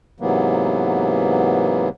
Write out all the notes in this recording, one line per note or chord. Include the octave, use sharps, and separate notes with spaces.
G#2 C3 E3 F#3 A#3 B3